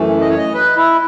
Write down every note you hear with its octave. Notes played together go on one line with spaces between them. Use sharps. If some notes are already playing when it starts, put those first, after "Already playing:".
Already playing: F#2 E3 A3
D#5
C#5
D#5
B4
E4